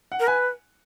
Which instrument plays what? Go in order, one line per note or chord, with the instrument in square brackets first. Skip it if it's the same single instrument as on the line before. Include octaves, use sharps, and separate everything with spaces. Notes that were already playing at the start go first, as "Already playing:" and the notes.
[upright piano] F#5
[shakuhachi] A#4
[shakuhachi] B4 [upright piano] G#5